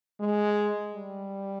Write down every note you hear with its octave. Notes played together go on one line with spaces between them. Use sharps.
G#3
G3